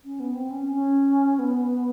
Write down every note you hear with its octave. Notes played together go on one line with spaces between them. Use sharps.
C#4
B3
C4
C#4
C#4
B3